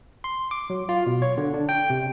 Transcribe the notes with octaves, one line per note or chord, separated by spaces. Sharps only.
C6
D6
F#3
F4
B2
C#5
D3
D4
G5
C3